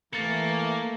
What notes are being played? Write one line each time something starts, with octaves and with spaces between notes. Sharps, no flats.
E3 A3 A#3 A6 C#7